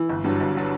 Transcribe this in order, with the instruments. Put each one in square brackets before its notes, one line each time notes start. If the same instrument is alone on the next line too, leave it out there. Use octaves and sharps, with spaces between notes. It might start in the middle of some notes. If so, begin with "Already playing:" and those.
Already playing: [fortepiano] E3
[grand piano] G1
G2 D3 F#3
G1
D3 F#3